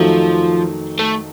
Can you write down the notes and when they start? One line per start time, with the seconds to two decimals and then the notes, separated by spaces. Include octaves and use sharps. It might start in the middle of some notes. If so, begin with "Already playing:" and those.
Already playing: F2 D#3 F3 F#3 A3
0.99 A3